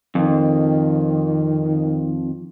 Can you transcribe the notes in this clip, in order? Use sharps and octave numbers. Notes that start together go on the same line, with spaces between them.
F2 D#3